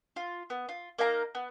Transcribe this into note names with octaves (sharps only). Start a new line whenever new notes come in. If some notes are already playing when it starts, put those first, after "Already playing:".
F4
B3
F4
A#3 D#4 F5 A#5
B3